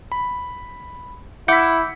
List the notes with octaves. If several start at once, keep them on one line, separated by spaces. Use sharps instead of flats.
B5
E4 F#5 D6 G6 B6 C#7